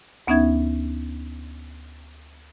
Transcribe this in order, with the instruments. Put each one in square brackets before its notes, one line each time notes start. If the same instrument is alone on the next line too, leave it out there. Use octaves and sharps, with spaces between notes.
[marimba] D2 B3 C#4 D#4 E5 G#6